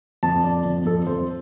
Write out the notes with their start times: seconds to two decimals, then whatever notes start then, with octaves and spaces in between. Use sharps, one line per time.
0.23 F2 A5
0.44 F2 D5
0.65 F2
0.85 F2 A4
1.07 F2 C5